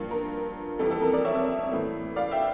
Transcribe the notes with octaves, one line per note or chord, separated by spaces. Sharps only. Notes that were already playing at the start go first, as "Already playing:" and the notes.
Already playing: G2 F3 A#3
A#4
F2 E3 G3 A#3 A4
A4
A#4
A#4 D5
C#5 E5
A2 E3 A#3
D5 F5
E5 G5